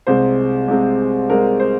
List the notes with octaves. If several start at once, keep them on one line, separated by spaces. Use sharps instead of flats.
C2 C3 G#3 C5
C2 C3 G#3
C2 C3 G#3 A#4
C5